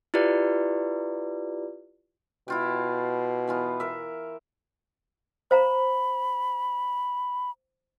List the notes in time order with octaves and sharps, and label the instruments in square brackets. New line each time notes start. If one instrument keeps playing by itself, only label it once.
[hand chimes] E4 F4 G4 B4 D5
[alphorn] B2 [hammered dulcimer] E4 F4 G5
[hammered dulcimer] E3 B3 F4
A#4 E5
[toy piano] C5 F5 A#5 [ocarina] B5